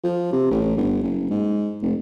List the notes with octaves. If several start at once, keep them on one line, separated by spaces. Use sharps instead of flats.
F3
C3
A1
G1
F#1
G#2
F1